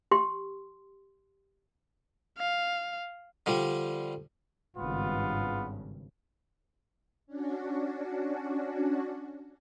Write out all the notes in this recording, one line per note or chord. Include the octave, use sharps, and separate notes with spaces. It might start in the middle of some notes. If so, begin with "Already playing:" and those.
G4 C6
F5
D3 F3 G3
G#1 G2 C#3 B3 F4
C#4 D4 F#4